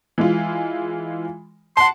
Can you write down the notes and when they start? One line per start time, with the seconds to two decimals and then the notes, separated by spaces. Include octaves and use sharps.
0.18 E3 G#3 F4
1.77 F#5 A5 C6